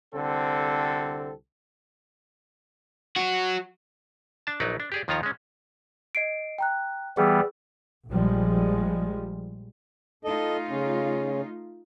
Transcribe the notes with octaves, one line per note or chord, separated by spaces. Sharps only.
C2 D3 C4 A4
F#3 F#4
D4 A5
A#1 F#3 D#4 B4 D5
D4
G4 G#4 D5
D#2 D#3 F3 F4 C#5 A#5
G#3 C#4
D#5 C7 D7
G5 A#5 F#6
E3 G3 B3 G#4 E6
A#1 F3 G3 G#3
A3 D#4 F4 A4 D#5
C#3 C#4